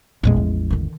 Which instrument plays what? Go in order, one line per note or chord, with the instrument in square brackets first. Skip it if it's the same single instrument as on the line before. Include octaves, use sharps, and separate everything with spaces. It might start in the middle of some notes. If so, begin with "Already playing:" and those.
[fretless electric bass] A1 E2 G#3 [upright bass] A#2
[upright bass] F3
D3 D#3